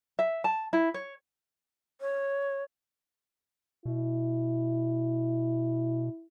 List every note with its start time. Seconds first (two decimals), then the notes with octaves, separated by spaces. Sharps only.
0.19 E5
0.44 A5
0.73 E4
0.94 C#5
2.01 C#5
3.85 B2 E4